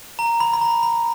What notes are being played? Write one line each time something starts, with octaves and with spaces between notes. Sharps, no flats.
A#5
B5
B5
A#5
B5